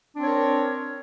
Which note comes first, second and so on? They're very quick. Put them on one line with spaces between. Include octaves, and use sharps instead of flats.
D4 C4 C#5 A#4